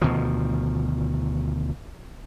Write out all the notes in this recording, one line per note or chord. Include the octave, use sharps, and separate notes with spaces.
D2 B2 D#3 F3